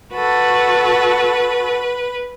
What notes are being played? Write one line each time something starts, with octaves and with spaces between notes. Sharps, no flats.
F#4 A4 B4